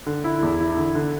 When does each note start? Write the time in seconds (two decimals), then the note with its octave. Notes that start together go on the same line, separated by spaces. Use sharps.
0.07 D3
0.24 E4
0.42 E2
0.60 E4
0.77 D3
0.95 D3